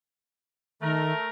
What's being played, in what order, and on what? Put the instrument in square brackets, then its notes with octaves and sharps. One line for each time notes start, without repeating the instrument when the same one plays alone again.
[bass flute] D#3 [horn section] A3 A#4